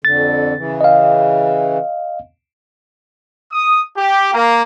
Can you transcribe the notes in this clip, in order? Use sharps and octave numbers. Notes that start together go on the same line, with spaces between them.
F2 D3 A6
C#3 E3
D#5 F5
D#6
G4
A#3